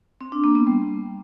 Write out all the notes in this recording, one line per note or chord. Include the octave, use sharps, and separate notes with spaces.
C4
D4
A#3
B3
G3